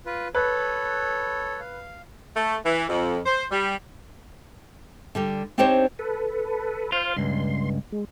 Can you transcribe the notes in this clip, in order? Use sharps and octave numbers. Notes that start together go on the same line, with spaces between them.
F4 B4
A4 B4 C#5
F5
A3
E3
F2
C5
G3
D3 G3 G4
C4 D4 D#4 G4 C5 C#5
A4 B4
F4 C5 F5
C#2 G2 C6
G#3